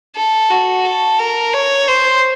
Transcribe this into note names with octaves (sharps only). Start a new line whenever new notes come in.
A4
F#4
A4
A#4
C#5
C5